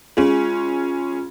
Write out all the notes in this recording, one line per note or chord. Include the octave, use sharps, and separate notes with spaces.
G#3 C#4 F4